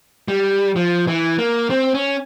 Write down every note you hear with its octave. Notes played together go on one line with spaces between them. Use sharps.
G3
F3
E3
A#3
C4
C#4